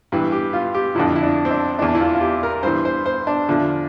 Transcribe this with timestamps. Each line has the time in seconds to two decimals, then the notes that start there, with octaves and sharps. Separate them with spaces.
0.12 G2 E3
0.32 G4
0.53 F4
0.75 G4
0.95 F2 D3 F3 E4
1.15 E4
1.23 D4
1.45 C4
1.51 D4
1.79 E2 E3 D4
1.95 E4
2.01 F4
2.14 F4
2.21 G4
2.43 A#4
2.63 G2 E3 C5
2.85 C5
3.06 C5
3.27 D4
3.48 E2 D3 F3